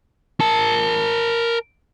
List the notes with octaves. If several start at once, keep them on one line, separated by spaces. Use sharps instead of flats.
A#4 A5